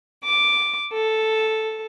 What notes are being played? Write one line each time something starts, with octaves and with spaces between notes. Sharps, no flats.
D6
A4